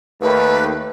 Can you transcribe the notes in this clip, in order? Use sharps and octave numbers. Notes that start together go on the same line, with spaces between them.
D#2 A3 B4